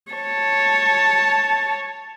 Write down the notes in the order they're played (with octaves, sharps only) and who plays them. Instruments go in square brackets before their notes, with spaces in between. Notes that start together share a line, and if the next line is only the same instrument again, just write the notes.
[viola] C#5 A5